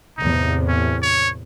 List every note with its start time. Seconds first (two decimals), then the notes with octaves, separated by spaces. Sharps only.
0.18 E2 A2 C3 D#4
0.68 C#4
1.02 C#5